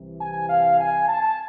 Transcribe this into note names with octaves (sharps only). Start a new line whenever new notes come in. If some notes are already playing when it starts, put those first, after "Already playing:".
Already playing: C2 C3 E3
G#5
F5
G#5
A5